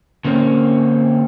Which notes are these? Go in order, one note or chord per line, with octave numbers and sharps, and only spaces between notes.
D3 A#3 C4 C#4